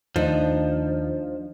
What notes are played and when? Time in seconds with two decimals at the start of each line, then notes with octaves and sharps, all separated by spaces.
0.16 D#2 D#3 F3 A3 D4 D#4